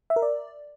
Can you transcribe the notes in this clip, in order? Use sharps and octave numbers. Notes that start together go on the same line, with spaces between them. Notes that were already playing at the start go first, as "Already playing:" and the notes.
E5
A#4
D5